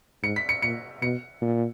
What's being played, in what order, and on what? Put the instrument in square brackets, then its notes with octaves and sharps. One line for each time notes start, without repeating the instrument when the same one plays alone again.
[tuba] G#2 [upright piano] C#7
[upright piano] B6
C#7
[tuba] A#2 [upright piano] C#7
[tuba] B2 [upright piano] C#7
[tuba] A#2